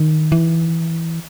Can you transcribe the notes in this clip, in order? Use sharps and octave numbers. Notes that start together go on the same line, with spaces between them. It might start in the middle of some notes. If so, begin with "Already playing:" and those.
Already playing: D#3
E3